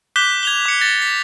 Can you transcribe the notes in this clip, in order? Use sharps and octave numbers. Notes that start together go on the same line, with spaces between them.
D6 F#6 G6 B6 G7
G#6 F7 G7
D6 C#7
A6 A#6
B6